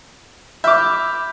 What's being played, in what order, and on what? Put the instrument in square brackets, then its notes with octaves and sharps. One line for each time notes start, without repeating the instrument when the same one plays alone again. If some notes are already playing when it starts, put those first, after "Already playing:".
[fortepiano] E5 D6 [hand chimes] B5 F6 G6